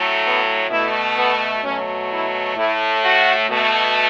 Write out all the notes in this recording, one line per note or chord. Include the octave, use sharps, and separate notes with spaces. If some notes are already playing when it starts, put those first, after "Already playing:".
Already playing: A2 F#3 A3
B3
B2 A3 E4
B3
B2 F#3 A3 C#4
E4
A2 A3 E4
F#4
B2 A3